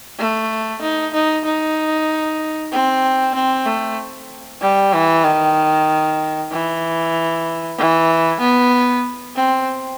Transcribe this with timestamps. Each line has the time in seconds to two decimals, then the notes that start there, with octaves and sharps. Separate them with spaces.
0.19 A3
0.82 D#4
1.14 D#4
1.45 D#4
2.72 C4
3.35 C4
3.66 A3
4.62 G3
4.94 E3
5.25 D#3
6.52 E3
7.78 E3
8.40 B3
9.36 C4